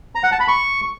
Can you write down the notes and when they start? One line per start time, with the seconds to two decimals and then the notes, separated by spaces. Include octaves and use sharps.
0.15 A#5
0.23 F#5
0.32 A5
0.40 B5
0.48 C#6